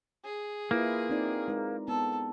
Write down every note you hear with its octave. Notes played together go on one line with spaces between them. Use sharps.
G#4
A#3 E4 F4 B4
C4 D#4 D5
G#3 D#4 A#4
B3 A4